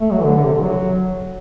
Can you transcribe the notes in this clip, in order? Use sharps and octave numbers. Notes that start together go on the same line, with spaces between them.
A3
F#3
E3
D3
D3
C3
D3
F#3